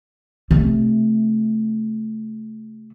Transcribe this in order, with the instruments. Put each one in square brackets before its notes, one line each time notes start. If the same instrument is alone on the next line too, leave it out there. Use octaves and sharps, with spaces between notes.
[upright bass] C3 A3